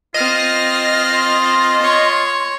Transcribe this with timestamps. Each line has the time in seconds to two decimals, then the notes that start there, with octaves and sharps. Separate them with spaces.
0.14 C4 F4 D#5 F6
1.14 C6
1.81 C#5